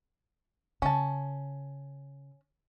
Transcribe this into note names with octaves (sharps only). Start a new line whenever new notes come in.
C#3 C#4 A5